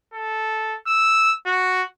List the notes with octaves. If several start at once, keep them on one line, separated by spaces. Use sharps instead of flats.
A4
E6
F#4